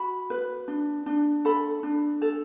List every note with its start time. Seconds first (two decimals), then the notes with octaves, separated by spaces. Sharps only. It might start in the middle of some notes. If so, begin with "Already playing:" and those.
Already playing: F#4 B5
0.30 B4
0.68 D4
1.06 D4
1.45 A4 B5
1.83 D4
2.22 A4